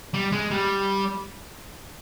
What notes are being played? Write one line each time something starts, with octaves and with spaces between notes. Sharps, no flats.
G3
G#3
G3